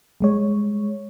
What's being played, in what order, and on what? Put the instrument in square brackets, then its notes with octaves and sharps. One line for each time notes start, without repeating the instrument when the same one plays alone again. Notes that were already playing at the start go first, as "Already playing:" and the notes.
[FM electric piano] G3 G#3 C#5